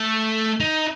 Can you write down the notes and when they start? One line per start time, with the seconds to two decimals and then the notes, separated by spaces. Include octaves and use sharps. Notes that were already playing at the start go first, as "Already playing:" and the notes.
Already playing: A3
0.60 D#4